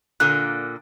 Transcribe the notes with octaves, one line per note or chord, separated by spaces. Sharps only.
A#2 D3 A#3 F#6